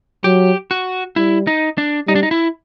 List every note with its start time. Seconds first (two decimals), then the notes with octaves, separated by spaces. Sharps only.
0.24 F#3 G4
0.71 F#4
1.16 G3 E4
1.47 D#4
1.78 D4
2.08 G3 D#4
2.15 D4
2.23 D#4
2.31 E4